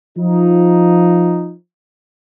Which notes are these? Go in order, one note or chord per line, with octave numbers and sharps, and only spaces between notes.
F3 D#4